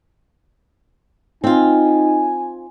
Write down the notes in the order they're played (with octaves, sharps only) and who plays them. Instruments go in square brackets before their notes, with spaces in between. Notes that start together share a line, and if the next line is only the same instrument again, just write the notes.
[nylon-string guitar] C4 F4 [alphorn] D#4 [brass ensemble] G#5